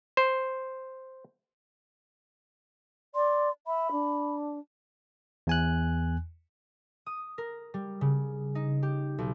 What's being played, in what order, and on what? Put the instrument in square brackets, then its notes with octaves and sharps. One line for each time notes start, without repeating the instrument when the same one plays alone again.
[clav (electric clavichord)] C5
[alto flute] D5 [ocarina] C6
[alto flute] E5 [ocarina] B5
[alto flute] D4
[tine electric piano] E2 G#5 F#6
[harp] D#6
A#4
G3
C#3
D#4
G4
B1